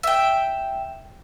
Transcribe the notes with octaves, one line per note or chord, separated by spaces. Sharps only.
E5 G5